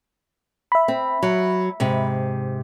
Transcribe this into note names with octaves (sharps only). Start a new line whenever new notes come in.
E5 B5
C4
F#3
G#2 C3